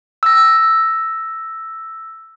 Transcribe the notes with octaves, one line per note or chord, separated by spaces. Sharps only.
E6 A#6